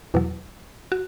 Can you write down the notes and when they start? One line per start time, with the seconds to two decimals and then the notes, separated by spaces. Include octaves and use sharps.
0.14 E2 B2 F#3
0.92 F#4